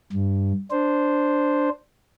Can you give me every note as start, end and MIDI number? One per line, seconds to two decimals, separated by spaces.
0.13 0.53 43
0.71 1.69 62
0.71 1.69 72